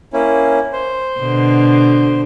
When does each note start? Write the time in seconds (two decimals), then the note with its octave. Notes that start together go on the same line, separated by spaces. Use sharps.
0.13 A#3 C#4 E4
0.73 C5
1.20 B2 D3